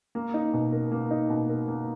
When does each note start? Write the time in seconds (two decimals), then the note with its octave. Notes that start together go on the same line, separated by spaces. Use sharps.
0.15 A#3
0.34 D#4
0.53 B2
0.72 A#4
0.92 A#3
1.11 D#4
1.30 B2
1.49 A#4
1.68 A#3